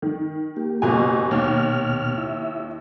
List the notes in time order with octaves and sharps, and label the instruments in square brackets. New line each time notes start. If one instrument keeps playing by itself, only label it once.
[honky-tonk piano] D#3
[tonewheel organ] A#3 G4
[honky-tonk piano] F#1 B2 G#5
[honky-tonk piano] D#2 [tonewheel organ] B2 F6
[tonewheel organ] E4 E5